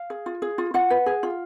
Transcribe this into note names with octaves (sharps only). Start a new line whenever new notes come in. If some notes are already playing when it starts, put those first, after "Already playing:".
Already playing: F5
G#4
F4
G#4
F4
F4 F#5
B4
G#4
F4